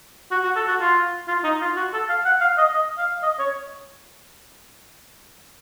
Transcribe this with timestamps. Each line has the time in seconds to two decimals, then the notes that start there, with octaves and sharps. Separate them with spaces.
0.31 F#4
0.44 F#4
0.56 A4
0.68 F#4
0.80 F4
1.28 F4
1.44 D#4
1.61 F4
1.77 F#4
1.93 A4
2.09 F5
2.25 F#5
2.41 F5
2.58 D#5
2.73 D#5
2.98 F5
3.23 D#5
3.39 C#5